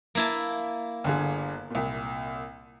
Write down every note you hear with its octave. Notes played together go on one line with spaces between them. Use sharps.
A#3 E4 A5
G1 D3 G#4
C2 A#2